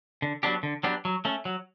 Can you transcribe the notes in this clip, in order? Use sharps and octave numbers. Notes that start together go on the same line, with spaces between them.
D3
F#3 B3 D4 G4
D3
F#3 B3 D4 G4
F#3
A3 C#4
F#3